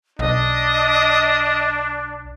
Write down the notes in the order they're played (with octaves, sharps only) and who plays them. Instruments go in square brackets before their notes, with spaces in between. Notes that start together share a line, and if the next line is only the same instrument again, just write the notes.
[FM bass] B1 [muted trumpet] D4 [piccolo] D#5